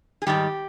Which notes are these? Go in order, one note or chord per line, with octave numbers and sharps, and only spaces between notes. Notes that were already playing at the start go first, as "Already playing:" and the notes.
G#4
G#2 D#3 G3 G4